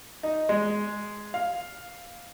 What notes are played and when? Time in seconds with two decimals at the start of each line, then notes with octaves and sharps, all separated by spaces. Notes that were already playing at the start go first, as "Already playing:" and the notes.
0.23 D#4
0.49 G#3
1.34 F5